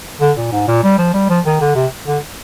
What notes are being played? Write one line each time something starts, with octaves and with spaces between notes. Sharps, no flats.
D3
A#2
G#2
A#2
G3
F3
G3
F3
D#3
D3
C3
D3